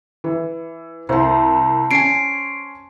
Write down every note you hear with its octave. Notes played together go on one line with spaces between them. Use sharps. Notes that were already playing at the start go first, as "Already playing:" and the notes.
E3
C2 C5 A5
C#4 G#5 C7 D7